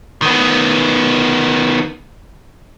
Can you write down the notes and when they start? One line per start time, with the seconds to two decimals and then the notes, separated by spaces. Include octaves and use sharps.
0.22 D#3 B3